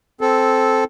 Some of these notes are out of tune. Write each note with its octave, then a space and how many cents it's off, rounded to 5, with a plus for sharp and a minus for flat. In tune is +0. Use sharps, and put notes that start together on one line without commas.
C4 +0 A4 -10